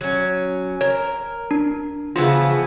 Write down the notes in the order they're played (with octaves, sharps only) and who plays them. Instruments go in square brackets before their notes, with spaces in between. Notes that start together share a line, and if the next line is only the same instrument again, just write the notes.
[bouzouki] F#3 C#4
[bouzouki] A#4 [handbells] C#5
[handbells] D4
[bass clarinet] C#3 [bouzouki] E3 F3 B3 [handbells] F4